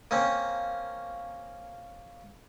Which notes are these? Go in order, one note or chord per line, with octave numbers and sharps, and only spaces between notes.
A#3 C4 C#4